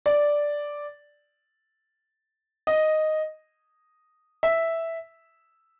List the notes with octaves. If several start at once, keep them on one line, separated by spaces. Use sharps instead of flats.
D5
D#5
E5